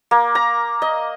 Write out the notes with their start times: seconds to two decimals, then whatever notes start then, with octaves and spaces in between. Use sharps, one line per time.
0.11 A#3
0.35 A#5
0.82 D#5